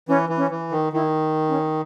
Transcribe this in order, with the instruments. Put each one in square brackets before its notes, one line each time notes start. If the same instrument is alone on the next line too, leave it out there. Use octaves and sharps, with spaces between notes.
[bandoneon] E3 [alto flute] C#4
[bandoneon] E3
[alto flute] C#4
[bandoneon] E3
D#3
[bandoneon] D#3 [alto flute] E4
[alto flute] C#4